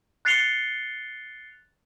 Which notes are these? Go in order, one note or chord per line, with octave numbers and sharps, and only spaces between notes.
F#6 A6 C7 C#7 F7 G7